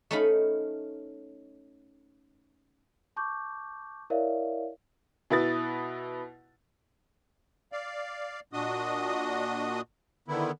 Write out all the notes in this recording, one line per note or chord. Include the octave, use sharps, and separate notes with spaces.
A3 C#4 D#4 F5 B5
A5 C#6 D6 G6
E4 A#4 C#5 D5 E5 F5
B2 E4 B4 D#6 A6
D5 F5
A#2 D4 F#4 D#5 D#6
D3 D#3 B3 E4